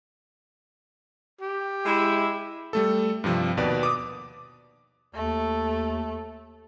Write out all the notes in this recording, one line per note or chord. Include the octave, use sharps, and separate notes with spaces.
G4
G#3 E4
G3 A3 A4
G2 C3 F3
D#2 B2 B4 D5
D6 D#6
D#2 A3